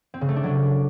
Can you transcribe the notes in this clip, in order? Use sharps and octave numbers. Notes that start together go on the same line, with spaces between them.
C4
C#3
A3
D4
F#3